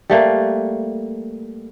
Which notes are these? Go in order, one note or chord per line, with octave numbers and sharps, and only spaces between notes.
G3 A3 A#3